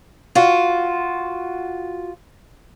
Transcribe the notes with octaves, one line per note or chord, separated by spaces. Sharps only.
F4 F#4